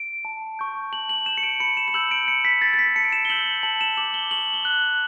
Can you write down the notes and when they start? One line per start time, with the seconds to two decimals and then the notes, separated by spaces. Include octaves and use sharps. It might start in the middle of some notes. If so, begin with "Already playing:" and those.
Already playing: D7
0.25 A5
0.59 C#6 G6
0.92 A5 F#7
1.09 F#7
1.26 C#6 G6 E7
1.37 C#7
1.43 D7
1.60 B5 C#7
1.77 E7
1.88 E7
1.94 E6 G6 F#7
2.11 D7
2.28 B5 C#7
2.45 B6
2.62 E6 G6 A6
2.74 A6
2.79 B6
2.95 A5 C#7
3.04 D7
3.12 E7
3.25 G7
3.30 E6 G6 F#7
3.63 A5 F#7
3.81 E7
3.97 D6 G6 F#7
4.14 G7
4.31 C#6 F#7
4.54 G7
4.65 F#6 F#7